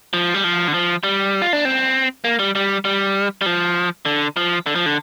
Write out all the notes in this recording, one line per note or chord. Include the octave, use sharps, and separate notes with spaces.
F3
G3
F3
D3
F3
G3
F4
D4
C4
A#3
G3
G3
G3
G3
F3
D3
F3
D3
F3
D3